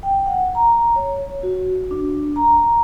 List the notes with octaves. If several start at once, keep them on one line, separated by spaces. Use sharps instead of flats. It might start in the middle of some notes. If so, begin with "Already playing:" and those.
G5
F#5
A#5
C#5
F#4
D4
A#5